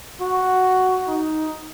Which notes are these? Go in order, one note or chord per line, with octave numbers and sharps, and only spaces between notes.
F#4
D#4